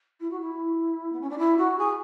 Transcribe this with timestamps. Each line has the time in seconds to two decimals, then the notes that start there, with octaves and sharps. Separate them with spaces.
0.20 E4
0.30 F#4
0.41 E4
1.12 B3
1.21 C#4
1.30 D4
1.38 E4
1.57 F#4
1.78 G#4